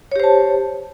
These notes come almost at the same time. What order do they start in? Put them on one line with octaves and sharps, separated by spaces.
C#5 G4 C5 A5